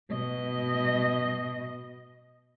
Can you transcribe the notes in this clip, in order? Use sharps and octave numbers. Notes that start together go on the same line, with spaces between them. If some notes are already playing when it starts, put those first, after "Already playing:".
B2 D#5